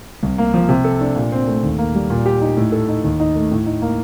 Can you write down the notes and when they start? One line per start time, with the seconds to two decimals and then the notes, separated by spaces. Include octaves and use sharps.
0.23 C2
0.38 A#3
0.54 F3
0.69 C3
0.84 A4
1.01 D4
1.16 A#2
1.32 C4
1.48 A3
1.63 D#2
1.78 A#3
1.95 G3
2.10 A#2
2.26 G4
2.42 D#4
2.57 A2
2.72 A4
2.89 D#4
3.04 D#2
3.20 D#4
3.35 A3
3.51 A2
3.66 D#4
3.82 A#3